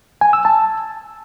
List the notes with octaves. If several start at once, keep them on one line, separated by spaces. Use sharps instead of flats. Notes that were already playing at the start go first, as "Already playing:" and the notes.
G#5
E6
A5